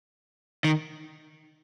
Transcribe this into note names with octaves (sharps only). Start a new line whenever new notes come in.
D#3